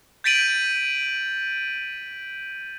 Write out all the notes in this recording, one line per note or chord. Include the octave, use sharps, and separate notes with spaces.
G6 A6 B6 D7 D#7 F#7